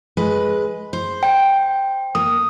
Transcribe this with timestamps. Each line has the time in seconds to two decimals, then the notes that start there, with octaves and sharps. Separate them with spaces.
0.17 G#3 B4
0.93 C5
1.23 G5
2.15 A#3 D#6